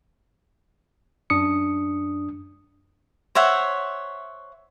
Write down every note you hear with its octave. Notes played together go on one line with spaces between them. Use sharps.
F#2 D4 D#6 C#7
C5 C#5 E5 F#5